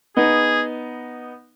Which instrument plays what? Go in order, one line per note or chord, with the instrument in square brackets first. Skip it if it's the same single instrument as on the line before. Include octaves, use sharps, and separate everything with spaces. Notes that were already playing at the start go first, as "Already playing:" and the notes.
[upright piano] B3 D#4 [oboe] G#4